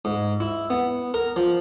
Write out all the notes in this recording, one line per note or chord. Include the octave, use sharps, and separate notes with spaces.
G#2
E4
B3
A#4
F3